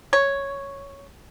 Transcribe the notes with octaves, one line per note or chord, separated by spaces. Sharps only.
C#5